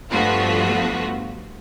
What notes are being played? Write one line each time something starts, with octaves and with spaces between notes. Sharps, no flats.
G2 F3 A3 B3 F4 F#4